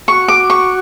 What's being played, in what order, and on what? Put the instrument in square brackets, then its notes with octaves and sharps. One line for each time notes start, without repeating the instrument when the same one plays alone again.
[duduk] F#4 [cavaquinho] C#6
[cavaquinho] D6
C#6